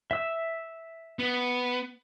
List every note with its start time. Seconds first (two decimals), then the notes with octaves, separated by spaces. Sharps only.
0.11 E5 E6
1.19 B3